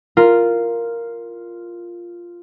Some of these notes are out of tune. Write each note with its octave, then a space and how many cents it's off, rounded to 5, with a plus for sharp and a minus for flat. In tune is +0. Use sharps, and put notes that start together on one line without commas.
F4 -5 A#4 +0